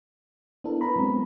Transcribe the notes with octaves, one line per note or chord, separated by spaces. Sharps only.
B3 D4 E4 A4 A#4
E4 A#4 B4 A#5 B5
F#3 G#3 B3 C4